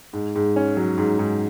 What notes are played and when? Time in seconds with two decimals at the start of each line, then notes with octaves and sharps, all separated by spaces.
0.13 G#2
0.35 G#2
0.56 C#4
0.77 F#3
0.98 G#2
1.19 G#2